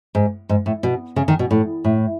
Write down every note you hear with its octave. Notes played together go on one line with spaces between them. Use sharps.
G#2
G#2
A2
B2
C#3
D#3
B2
A2
A2